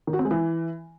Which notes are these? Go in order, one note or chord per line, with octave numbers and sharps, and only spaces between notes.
D#3
F#4
C4
G#3
E3